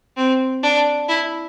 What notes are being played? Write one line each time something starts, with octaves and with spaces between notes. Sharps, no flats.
C4
D4
E4